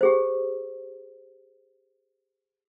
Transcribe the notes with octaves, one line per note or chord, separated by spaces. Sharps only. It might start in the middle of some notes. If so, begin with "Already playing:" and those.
G4 G#4 C5